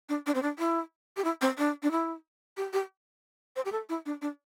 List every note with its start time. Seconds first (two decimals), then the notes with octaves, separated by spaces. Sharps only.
0.09 D4
0.26 D4
0.35 C4
0.42 D4
0.59 E4
1.17 G4
1.24 E4
1.41 C4
1.58 D4
1.83 D4
1.91 E4
2.57 G4
2.73 G4
3.56 C5
3.65 G4
3.72 A4
3.89 E4
4.06 D4
4.22 D4